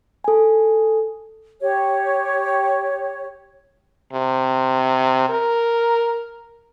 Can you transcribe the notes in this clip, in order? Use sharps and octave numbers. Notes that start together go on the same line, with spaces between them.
A4 G#5
G4 C#5
C3
A#4